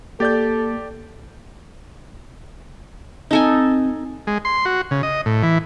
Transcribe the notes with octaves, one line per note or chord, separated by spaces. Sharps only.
A#3 G4 A4 D5 G6 A6
C4 D#4 A4 G#5
G#3
C6
F#4
C#3
D#5
A2
E3